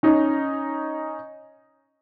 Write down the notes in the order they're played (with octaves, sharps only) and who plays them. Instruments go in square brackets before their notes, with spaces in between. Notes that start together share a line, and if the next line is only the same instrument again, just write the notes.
[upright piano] C#4 D#4